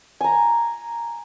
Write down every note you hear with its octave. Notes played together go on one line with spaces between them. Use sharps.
G#5 A#5